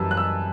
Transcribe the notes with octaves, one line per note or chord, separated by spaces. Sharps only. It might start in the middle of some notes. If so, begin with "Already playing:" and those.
Already playing: F#2 E3 G3 A5 E6
F#6
E6